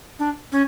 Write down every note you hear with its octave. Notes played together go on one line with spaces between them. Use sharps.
D4
C#4